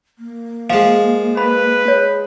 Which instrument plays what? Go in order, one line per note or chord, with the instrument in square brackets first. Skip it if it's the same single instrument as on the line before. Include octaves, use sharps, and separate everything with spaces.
[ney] A#3
[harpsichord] F3 G#3 [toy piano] F5
[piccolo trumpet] B4 [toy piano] B5
[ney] G#4 [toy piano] C#5